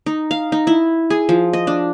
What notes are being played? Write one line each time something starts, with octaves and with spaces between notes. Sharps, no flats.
D#4
F5
D#4
E4
G#4
F3
D#5
D4